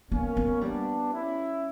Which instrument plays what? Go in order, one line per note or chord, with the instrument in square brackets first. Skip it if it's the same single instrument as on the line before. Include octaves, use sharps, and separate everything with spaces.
[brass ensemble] A#3 C#4 [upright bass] B3
[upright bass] B3
[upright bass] G3 [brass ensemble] B3 D4
[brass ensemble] C#4 E4